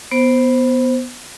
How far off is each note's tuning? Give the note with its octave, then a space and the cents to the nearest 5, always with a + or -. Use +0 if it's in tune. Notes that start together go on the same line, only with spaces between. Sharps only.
B3 +0 C5 +0